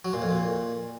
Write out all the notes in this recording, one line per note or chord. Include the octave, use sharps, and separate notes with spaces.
F#3
A#2
F2
A#2